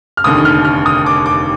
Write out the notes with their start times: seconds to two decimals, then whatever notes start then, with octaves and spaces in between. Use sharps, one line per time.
0.17 F6
0.24 F1 D#2 D3 D#6
0.45 F6
0.65 F6
0.86 D#6
1.06 D6
1.26 D6